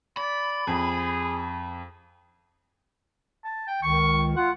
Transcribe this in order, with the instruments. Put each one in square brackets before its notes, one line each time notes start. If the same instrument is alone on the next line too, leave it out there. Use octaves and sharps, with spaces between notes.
[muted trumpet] D5 [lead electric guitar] B5
[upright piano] F2 [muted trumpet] G#4
[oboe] A5
G5
[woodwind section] C#2 D#3 [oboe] C#6
[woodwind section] F4 [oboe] F#5